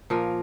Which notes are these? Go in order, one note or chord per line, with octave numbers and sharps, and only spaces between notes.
A#2 F3 A#3 A#4